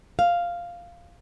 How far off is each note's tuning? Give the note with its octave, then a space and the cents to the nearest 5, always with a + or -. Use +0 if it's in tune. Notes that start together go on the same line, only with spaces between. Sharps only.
F5 -5